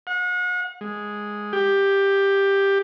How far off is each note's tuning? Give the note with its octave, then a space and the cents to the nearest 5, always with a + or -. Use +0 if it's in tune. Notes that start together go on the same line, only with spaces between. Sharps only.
F#5 -40
G#3 +0
G4 +10